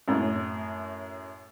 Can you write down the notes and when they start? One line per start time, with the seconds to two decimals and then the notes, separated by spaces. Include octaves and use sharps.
0.08 F#2 A2